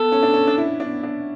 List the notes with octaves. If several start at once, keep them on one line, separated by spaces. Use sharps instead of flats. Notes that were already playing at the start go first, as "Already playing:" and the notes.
Already playing: B3 A4
C#4
D4
C#4
D4
E4
D4
D4